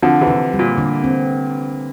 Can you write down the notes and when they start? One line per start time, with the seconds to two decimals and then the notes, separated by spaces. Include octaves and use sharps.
0.02 D3 F3 C4
0.21 C3 E3
0.27 D3
0.53 G3
0.59 A#2
0.77 D3
1.04 C4